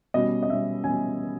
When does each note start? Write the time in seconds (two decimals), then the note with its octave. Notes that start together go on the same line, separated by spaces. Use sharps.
0.14 B2 G3 C#4 D#5
0.43 D#5
0.49 B2 G3 C#4 E5
0.84 B2 G3 C#4 G#5